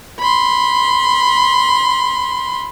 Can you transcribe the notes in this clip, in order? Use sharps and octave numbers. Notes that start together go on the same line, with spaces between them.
B5 C6